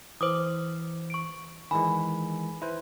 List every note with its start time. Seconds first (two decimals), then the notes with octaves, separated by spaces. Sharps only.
0.21 E3 C5 D6 D#6
1.10 C#6 D7
1.71 D#3 E3 G#3 G#5 B5
2.62 E4 B4 C5